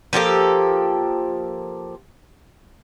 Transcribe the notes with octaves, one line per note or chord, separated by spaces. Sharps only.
F3 A#3 G4 A4